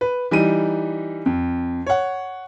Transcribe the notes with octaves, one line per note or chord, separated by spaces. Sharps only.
B4
E3 G3 D#4 D#7
F2
C#5 F#5